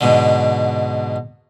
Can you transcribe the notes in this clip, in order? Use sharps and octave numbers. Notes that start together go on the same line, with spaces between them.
G#2 B2 D3